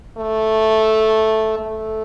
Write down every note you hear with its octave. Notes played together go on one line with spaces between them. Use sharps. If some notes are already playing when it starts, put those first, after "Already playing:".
A3
A3